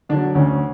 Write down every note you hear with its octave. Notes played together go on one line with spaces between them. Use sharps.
D3 F#3 D4
D2 C#4